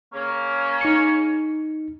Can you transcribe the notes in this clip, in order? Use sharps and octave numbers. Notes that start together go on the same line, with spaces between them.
C#3 A#3 C#4
D#4 C#7